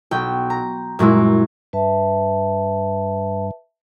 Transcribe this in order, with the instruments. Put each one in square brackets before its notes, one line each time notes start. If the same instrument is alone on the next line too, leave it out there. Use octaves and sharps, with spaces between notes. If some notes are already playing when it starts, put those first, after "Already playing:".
[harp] B1 G5
A#5
F#2 A#2 G#3 E4
[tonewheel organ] G2 [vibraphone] B4 E5 A5